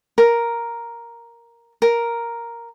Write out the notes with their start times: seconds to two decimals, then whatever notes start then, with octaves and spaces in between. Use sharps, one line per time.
0.18 A#4
1.82 A#4